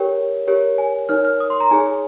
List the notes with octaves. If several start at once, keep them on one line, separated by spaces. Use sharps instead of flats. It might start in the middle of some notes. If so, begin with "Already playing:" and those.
Already playing: G4 A#4 C#5 G5
G4 A#4 C#5
G#5
D#4 A#4 C#5 F6
F6
D#6
C6
A#5
D#4 G#4 C#5 G#5